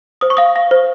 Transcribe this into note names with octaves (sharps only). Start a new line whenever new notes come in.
C5 D#6
C#6
F5 D#6
F5
C5